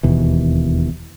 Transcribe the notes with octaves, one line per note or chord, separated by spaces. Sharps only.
E1 D#2 B2 E3